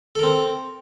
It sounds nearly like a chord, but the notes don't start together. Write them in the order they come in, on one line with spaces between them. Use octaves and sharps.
A4 A#4 C4